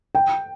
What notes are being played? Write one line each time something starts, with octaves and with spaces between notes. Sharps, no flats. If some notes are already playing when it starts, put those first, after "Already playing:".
G5